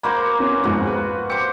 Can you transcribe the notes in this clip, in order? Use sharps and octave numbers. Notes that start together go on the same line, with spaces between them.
A#3 F#4 C5 B5
B3 C#4 B4
B1 F2 G#2 F#4
B4
G4 C5 D6 C#7